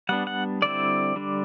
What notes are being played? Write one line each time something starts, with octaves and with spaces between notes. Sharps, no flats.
G3 B3 D4 F#5
F#5
D3 G3 C4 E4 D5
D3 G3 D4